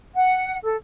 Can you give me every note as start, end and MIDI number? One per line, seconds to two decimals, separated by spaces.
0.16 0.57 78
0.64 0.76 69